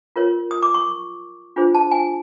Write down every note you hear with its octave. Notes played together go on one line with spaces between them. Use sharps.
F4 A#4 C#5
D#6
D6
C#6
D4 F4 G#4 C5
A5
G#5